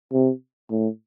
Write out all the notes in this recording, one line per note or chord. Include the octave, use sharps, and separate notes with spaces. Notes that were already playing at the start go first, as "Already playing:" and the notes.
C3
A2